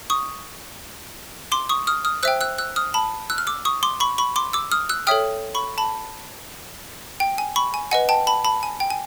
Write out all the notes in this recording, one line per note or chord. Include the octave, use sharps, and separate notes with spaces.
C#6 D#6
C6 D6
C#6 D#6
D#6 F6
D#6 F6
C5 E5 G5 E6 F#6
E6 F#6
E6 F#6
D#6 F6
A5 B5
E6 F#6
F6
D6 E6
C#6 D#6
C6 D6
B5 C#6
B5 C#6
C6 D6
D6 E6
D#6 F6
E6 F#6
A4 C#5 E5 G5 D#6 F6
B5 C#6
A5 B5
G5
G#5
B5 C#6
G#5
B4 D#5 F#5 G#5
G5 A5
A5 B5
A5 B5
G#5
G5
G#5